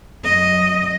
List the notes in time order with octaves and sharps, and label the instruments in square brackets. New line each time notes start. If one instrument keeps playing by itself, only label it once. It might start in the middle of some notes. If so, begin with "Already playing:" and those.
[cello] F#2 D#5